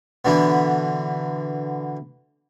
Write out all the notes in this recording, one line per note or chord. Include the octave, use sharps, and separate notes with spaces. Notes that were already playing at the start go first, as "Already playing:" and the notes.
B2 D3 E3 B3